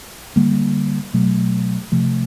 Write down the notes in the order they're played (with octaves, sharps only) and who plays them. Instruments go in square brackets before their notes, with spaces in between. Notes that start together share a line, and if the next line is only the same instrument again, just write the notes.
[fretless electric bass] D3 G3 A#3
B2 F#3 A3
C3 F3 A3